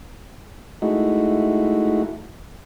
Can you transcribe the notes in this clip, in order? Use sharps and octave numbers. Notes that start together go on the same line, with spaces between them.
G#3 A3 D#4 E4 F#4